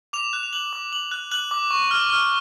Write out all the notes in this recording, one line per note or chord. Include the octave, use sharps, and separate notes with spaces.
D6 F7
F#6
F7
F#6 F#7
D6
D6 F#7
F#6
F#6 F#7
D6
C#6
F6
F6